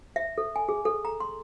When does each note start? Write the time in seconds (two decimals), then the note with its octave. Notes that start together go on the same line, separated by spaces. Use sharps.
0.16 E5
0.38 A4
0.56 G#5
0.69 G#4
0.85 A4
1.05 A#5
1.20 C6